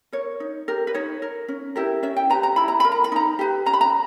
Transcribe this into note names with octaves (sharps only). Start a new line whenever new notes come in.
A#4 C#5
D#4
G4 A#4
B4
D#4 C#5
A#4
C#4
E4 G4 A#4
C#4 E5
G5
G4 B4 A#5
A#5
E4 B5
A#5
A#4 B5
A#5
B5
D#4 A#5
G4 B4
C#4 A#5
B5
A#5